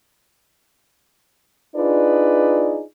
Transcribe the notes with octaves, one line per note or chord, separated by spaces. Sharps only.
D4 D#4 F4 G#4 B4 D5